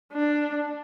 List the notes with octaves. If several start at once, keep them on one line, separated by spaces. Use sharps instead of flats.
D4